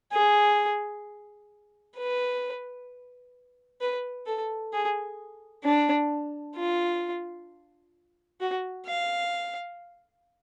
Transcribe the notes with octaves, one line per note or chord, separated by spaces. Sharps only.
G#4
B4
B4
A4
G#4
D4
F4
F#4
F5